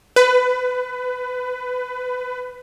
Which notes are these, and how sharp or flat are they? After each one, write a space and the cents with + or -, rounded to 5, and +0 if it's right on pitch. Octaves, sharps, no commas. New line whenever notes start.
B4 +20